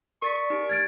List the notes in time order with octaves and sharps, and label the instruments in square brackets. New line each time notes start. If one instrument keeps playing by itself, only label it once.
[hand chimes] A#4 A6 B6 [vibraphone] D5 [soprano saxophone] C#6
[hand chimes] D#4 G4 D7
[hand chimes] F6 [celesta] G#6 A6 D7